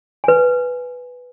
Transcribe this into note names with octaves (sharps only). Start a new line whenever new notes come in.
B4 G#5